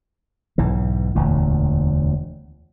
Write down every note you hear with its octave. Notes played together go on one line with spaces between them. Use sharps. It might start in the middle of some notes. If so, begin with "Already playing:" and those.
B1 G#2 E3
E1 D2 A#2